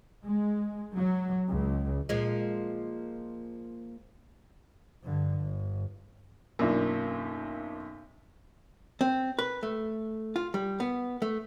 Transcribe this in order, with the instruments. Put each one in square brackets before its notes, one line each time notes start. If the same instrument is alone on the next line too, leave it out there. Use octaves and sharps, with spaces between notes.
[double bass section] G#3
F#3
C#2
[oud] A#2 F3 G#3
[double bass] G2 D3
G1
[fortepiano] B1 F#2 [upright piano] A#3 D4 F4
[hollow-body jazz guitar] C4
B4
A3
F4
G3
B3
A3